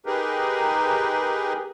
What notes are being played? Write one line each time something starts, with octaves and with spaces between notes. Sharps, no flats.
D#4 G4 G#4 A#4 B4